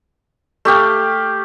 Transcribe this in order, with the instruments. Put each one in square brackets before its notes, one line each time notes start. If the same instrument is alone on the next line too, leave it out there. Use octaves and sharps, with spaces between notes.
[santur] A3 G4 F5